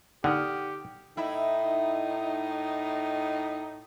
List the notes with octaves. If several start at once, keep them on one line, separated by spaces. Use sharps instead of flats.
D3 D#4 G4 F#5 D#6 F6
A2 D#4 E4